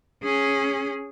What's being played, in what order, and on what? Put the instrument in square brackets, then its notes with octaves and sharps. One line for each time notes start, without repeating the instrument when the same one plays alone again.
[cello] C#4 G#4